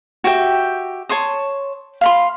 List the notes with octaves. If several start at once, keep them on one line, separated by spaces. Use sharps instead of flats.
F#4 G4 E5 G5
C#5 A5 C6 D#6
F5 B5 C6